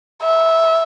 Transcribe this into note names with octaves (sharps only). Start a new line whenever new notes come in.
E5